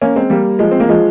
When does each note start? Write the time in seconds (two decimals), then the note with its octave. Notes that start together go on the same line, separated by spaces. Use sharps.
0.02 A#3 C#4
0.16 G#3 C4
0.30 G3 A#3
0.59 F3 G#3
0.71 C4
0.80 A#3
0.89 F3 G#3